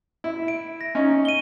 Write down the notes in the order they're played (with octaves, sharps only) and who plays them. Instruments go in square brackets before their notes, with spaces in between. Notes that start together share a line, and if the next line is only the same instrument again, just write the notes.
[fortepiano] E4
[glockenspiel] D7
A#6
[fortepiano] C#4 D#4
[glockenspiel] D#7 G7